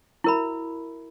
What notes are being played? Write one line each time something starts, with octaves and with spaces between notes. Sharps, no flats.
E4 F#4 A#4 E5 B5